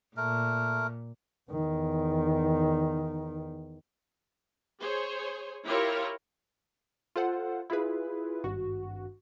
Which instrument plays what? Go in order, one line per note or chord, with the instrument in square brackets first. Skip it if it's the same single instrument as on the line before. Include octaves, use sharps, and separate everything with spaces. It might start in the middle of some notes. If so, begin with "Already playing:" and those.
[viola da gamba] A#2 [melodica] A3 A#4
[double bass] E2 D#3
[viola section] G#4 C5 C#5
E4 F4 G4 A#4 C#5 F5
[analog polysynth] F4 A4 C5 F#5
E4 F4 G#4 B4
G#1 G2 F#4